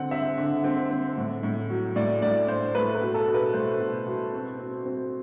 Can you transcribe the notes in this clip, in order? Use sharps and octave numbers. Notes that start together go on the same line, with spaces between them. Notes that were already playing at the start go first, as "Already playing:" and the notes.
Already playing: D3 C4 F#5
C4 E5
D3
C4
C4
A2
A2
F#3
A2 D5
A2 D5
A2 C5
A3 B4
B4
B2
A4
B2
B4
A3 C5
B2
B2
C4
C4
C4